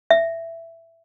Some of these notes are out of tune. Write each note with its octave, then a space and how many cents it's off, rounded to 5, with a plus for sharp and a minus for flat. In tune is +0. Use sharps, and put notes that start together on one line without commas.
E5 +10